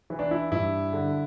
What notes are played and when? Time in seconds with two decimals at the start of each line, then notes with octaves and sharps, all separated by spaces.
0.10 E3
0.19 D4
0.31 E4
0.51 G2 E4
0.93 D3